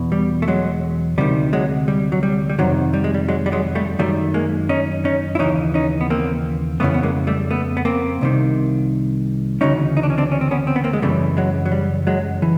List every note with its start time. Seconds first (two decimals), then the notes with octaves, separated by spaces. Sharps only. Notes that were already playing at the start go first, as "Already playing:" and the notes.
Already playing: E2 B2
0.12 G3
0.42 A3
0.48 F#3 G#3
1.18 D2 C3 D#3 G3
1.53 F#3 G#3
1.88 G3
2.12 F#3
2.23 G3
2.50 G3
2.59 F2 C3 D#3 F#3
2.94 G3
3.04 G#3
3.14 G3
3.28 F#3 G#3
3.46 G3
3.52 F#3 G#3
3.75 G3 A3
3.99 F#2 D#3 G3 A3
4.34 G#3 A#3
4.69 C#4 D#4
5.05 C#4 D#4
5.35 E4
5.39 D#2 C#3 E3 C#4 D#4
5.74 C#4 D#4
6.01 B3
6.10 A#3 C4
6.80 F2 C#3 E3 A3 B3
6.94 B3
7.03 G#3 A#3
7.27 G3 A3
7.51 A3 B3
7.77 B3
7.85 A#3 C4
8.21 C2 C3 D#3
9.61 D2 C#3 E3 C#4 D#4
9.97 D#4
10.03 D4
10.10 C#4
10.18 C4 D4
10.32 C#4
10.41 C4
10.51 B3 C#4
10.67 C4
10.76 B3
10.84 A#3 C4
10.93 G#3
11.02 F#2 C#3 E3 G3 A3
11.37 F#3 G#3
11.66 F#3
11.72 G3
12.07 F#3 G#3
12.42 E3